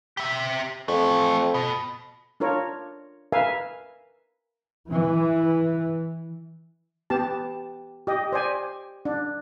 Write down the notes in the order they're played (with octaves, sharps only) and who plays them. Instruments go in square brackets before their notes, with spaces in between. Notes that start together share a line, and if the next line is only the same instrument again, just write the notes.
[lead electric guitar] G4 E5
[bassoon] F2 [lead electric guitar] E3 A3
[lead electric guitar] B2
[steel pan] D4 F4 A#4 C#5
A#4 B4 E5 F5 G#5
[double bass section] E3
[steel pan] B3 G4 A5
G4 D#5
C5 D5 G#5
D4